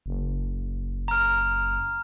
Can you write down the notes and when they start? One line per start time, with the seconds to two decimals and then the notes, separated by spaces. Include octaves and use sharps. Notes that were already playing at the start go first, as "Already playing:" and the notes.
0.06 F#1
1.08 A#5 F6